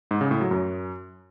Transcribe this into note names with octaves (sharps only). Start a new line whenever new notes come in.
G#2
C#3
A2
F#3
F#2